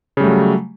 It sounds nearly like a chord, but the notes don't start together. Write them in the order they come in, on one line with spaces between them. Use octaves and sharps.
C#3 G3 A3 F#3